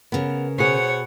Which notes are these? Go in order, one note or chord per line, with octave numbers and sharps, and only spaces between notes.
C#3 B3 A#4
B2 G#4 C5 C#5 F#5